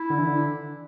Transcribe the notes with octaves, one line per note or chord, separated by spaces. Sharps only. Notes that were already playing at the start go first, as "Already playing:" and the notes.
Already playing: E4
D3
E3
D3